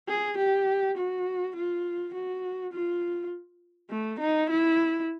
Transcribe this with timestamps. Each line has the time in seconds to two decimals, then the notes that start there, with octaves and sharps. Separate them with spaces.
0.08 G#4
0.38 G4
0.97 F#4
1.56 F4
2.14 F#4
2.73 F4
3.91 A3
4.20 D#4
4.50 E4